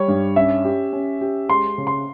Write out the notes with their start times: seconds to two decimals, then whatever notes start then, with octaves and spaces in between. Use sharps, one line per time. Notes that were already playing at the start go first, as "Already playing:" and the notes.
Already playing: G3 C#5
0.08 G2
0.36 C#4 E5
0.65 G4
0.93 C#4
1.21 G4
1.49 G#3 C6
1.78 C#3
1.87 C6